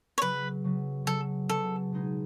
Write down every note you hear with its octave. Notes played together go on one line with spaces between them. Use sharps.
C#5
C#3 F#3 B3 B4
C#3 F#3 B3
C#3 F#3 B3 A4
C#3 F#3 B3 A4
B2 G#3 D#4 G#4